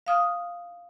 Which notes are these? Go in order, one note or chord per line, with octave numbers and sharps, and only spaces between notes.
F5 D#6 F6